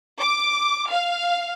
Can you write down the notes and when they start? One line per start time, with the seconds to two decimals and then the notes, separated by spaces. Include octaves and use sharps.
0.20 D6
0.90 F5